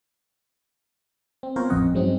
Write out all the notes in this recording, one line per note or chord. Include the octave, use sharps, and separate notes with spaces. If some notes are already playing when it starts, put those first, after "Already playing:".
C4
B3 C4 F4 A#4 C5 C#5
A1 F2 C4 C#4 D#5 F#5
G2 F#3 G#3 C4 C#4 D#4